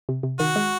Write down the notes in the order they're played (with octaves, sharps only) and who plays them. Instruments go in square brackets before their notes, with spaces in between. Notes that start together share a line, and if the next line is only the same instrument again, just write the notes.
[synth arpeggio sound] C3
C3
[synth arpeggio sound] D#3 [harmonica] F#4
[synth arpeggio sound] G#3